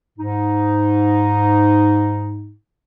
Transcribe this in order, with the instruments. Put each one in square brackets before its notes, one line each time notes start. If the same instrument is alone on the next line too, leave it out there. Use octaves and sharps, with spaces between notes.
[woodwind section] G#2 D#4